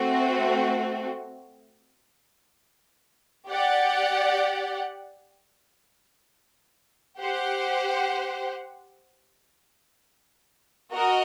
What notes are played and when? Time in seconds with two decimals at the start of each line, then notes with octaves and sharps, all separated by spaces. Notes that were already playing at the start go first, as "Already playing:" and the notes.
Already playing: A3 C4 F#4
3.48 G4 D5 F#5
7.20 G4 C5 F#5
10.93 F#4 A#4 D#5